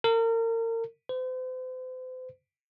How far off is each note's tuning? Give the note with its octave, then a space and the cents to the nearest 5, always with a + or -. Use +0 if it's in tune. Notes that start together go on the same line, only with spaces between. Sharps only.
A#4 -35
C5 -40